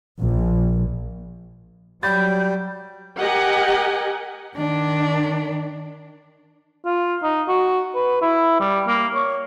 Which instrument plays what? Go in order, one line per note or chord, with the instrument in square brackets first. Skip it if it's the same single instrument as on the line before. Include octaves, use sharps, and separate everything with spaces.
[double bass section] A#1
[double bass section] F#3 [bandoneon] G3 [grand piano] B5 A6 [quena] G6
[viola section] G4 A#4 D#5 F#5 G#5
[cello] D#3 D4
[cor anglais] F4
D#4
F#4
B4
E4
G3
A#3
C#5